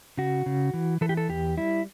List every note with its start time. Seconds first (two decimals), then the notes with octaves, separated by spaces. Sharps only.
0.17 C#3 F#4
0.46 C#3
0.74 E3
1.01 E3 A4
1.09 G4
1.17 A4
1.29 E2 G4
1.57 G3 E4